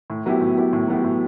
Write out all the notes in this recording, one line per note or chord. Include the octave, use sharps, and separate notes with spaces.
A2
F#3 B3 E4 G4
A2
F#3 B3 E4 G4
A2
F#3 B3 E4 G4
A2